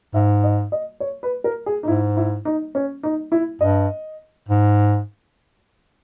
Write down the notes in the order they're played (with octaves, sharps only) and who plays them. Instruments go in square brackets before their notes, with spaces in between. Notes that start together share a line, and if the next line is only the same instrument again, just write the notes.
[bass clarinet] G#2 [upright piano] E5
[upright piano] D#5
D#5
C#5
B4
A#4
G#4
D#4
[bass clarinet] G#2 [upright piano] E4
[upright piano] E4
D#4
C#4
D#4
E4
[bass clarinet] G2 [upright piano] D#5
[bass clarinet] G#2